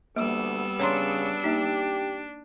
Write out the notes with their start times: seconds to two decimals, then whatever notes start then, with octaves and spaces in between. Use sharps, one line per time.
0.16 D2 G3 A#3 B3 E6
0.79 C#3 D4 C#5 A#5 C6
1.44 A#3 D#4 G4